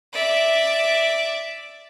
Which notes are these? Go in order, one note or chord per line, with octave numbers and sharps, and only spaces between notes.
D5 E5